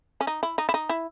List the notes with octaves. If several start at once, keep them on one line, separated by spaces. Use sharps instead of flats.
C#4
D#4
E4
D#4
E4
D#4
E4